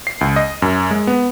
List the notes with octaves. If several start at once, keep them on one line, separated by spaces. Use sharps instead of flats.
C7
C#2
D#5
F#2
G#3
B3